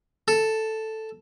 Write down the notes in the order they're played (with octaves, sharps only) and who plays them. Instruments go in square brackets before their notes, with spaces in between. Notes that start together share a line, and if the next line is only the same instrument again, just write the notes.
[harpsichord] A4